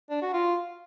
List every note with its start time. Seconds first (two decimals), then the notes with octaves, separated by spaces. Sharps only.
0.10 D4
0.22 F#4
0.33 F4